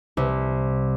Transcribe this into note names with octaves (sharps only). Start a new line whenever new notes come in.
C2